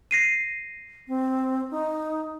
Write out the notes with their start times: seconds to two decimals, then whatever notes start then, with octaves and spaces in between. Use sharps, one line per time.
0.11 A#6 C7 D#7
1.08 C4
1.71 D#4